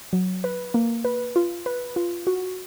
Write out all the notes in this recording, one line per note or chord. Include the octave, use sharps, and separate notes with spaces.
F#3
B4
A#3
B4
F4
B4
F4
F#4